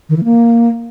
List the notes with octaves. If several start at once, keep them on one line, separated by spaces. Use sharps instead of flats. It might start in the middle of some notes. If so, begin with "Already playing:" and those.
D#3
E3
A#3